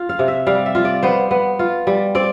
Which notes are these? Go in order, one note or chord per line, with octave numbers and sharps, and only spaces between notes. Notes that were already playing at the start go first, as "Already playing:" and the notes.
Already playing: F4
F5
C3
E5
G3 F5
E5
F4
D5
B3 C5
B3
F4
G3
C4 D5